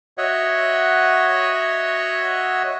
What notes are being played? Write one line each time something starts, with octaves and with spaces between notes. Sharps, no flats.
F#4 C#5 D#5 E5 F#5